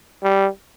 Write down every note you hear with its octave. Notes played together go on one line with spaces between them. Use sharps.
G3